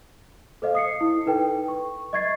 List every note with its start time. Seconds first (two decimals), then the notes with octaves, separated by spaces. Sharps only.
0.62 A4 C5 D#5 F5
0.75 D#6 C7 C#7
1.01 E4
1.26 D#4 A4 B4 G5
1.68 C#6
2.13 D#5 E5 C#6 G#6 A6 C7